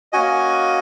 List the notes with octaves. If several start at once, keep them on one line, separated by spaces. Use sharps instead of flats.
A#3 C#4 F#4 D#5 G#5